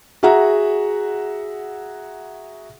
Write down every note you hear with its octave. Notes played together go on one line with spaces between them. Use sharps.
F#4 G#4 E5 F#5 A#5